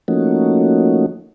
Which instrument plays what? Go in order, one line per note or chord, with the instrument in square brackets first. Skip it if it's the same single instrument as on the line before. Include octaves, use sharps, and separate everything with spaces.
[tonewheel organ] F3 A3 A#3 C#4 D#4 F#4